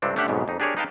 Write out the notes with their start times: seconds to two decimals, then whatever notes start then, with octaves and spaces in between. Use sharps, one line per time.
0.02 C#2 G2 C3 C4 D4 A4
0.16 A3 C#4 D4 G4 E5 F#5
0.28 B1 F2 G#2 B2
0.48 F2 D#4
0.60 D4 G4 G#4 A#4 C#5 D5
0.77 D#4 B4 F5 G5 A5